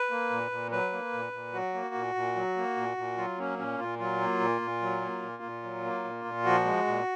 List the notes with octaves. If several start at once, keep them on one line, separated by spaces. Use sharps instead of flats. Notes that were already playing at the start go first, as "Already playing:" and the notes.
Already playing: B4
A#3
A#2
A#2
F#3 B4
A#3
A#2
A#2
F#3 F#4
A#3
A#2
A#2
F#3
A#3
A#2
A#2
F#3 F4
A#3 C#4
A#2 C#4
A#2 F4
F#3 F4
A#3
A#2
A#2
F#3
A#3
A#2
A#2
F#3
A#3
A#2
A#2
F3 F#4
G#3
A#2